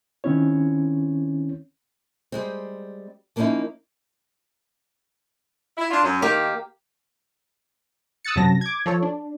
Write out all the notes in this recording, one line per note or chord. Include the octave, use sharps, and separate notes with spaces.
D#3 C4 C#4 E4 C#5
G3 G#3 C4
F3 A#3 B3 C#4 D#4 E4
E4
D4 F4
F#2 F#3
D#3 A#3 G4
D#6 E6 F#6 A6 C#7
F#2 C3 F#3 A5 A#6
D6 G#6
F3 A4 C#5
D4